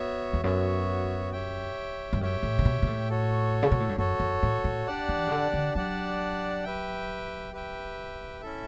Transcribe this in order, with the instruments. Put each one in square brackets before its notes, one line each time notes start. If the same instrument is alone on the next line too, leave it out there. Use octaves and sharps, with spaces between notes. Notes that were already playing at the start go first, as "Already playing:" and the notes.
Already playing: [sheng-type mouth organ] B3 F#4 C#5 E5
[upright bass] E2
[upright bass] F#2 [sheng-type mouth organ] B3 F#4 C#5 E5
[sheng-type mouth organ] G4 C#5 E5 G5
[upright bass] G2
[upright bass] F#2 [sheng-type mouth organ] G4 C#5 E5 G5
[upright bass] A2
C#3
B2
B2
A2
[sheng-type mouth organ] F#4 A4 C#5
[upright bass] C#3
B2
A2
G2
[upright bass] F#2 [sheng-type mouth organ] F#4 A4 C#5
[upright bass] F#2
A2
A2
[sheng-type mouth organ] D4 G4 D5 F#5 A5
[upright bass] E3
C#3
D3
D3
[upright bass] F#3 [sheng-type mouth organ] D4 G4 D5 F#5 A5
[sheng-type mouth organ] G4 B4 E5 G5
G4 B4 E5 G5
C#4 E4 A4 E5